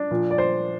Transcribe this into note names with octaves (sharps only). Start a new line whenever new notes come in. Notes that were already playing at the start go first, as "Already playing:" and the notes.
Already playing: D4
A#2 F3
D5
C5